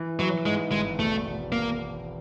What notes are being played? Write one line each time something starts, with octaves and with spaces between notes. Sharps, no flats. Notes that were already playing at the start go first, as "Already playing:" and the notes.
Already playing: E3
E3 F#3
G#2 G#3
G#1 G#3
E1 A3
E1
A#3